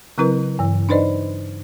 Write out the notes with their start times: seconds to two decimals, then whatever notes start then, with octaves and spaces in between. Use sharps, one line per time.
0.18 C#3 F#3 C4 E4 A#4 B4
0.59 G2 E3
0.89 D4 D#4 B4 C5 D5 D#5